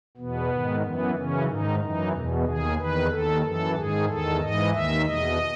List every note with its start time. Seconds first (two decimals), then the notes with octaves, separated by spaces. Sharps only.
0.17 E2 B2 B3
0.50 G#2 D#3
0.82 F#2 E3 B3
1.15 F#2 C#3 E3 C#4
1.47 G#2 D#3 D#4
1.80 F#2 E3 D#4
2.12 E2 B2
2.45 D#2 D#3 G#4
2.77 E2 D#3 B4
3.10 D#2 D#3 A4
3.42 F#2 E3 A4
3.75 G#2 D#3 G#4
4.08 E2 D#3 A4
4.40 G#2 E3 D#5
4.72 D#2 D#3 E5
5.05 E2 B2 D#5